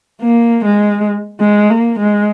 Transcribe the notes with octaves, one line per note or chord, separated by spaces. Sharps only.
A#3
G#3
G#3
A#3
G#3